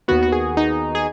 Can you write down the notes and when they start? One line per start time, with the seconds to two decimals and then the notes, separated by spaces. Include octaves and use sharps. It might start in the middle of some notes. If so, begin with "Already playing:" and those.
0.08 D#2 D#3 B3 F#4
0.23 F#4
0.32 G#4
0.57 D#4
0.95 G#4